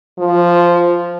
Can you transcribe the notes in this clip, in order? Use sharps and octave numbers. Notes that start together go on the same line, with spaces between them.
F3